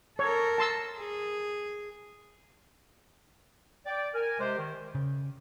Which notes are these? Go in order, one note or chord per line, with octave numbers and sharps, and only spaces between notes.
A4 A#4 C#5
A5 C6 E6
G#4
D5 G5
A#4 G#5
C3 G#3 G4 C5
D#3
C#3